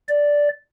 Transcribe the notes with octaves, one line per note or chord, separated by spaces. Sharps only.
D5